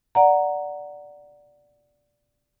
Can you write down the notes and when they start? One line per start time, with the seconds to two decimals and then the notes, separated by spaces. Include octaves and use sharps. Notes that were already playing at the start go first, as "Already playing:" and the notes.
0.15 D5 F#5 A#5